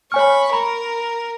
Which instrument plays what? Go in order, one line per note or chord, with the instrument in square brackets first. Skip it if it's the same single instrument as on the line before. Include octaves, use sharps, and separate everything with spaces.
[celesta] C#5 G#5 F6 [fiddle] B5 C#6
[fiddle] A#4 [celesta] A#5 B5